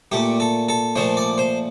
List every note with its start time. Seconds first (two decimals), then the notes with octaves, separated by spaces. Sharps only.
0.12 A#2 A3 G4
0.40 A4
0.69 A4
0.96 A#2 F3 A3 C5
1.17 D5
1.38 C5